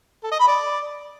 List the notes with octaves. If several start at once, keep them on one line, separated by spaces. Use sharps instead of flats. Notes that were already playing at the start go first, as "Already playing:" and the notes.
A4
D#5
B5
D5